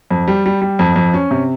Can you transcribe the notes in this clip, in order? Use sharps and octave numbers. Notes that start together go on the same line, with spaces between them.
F2
G3
G3
G3
F2
F2
C#4
C3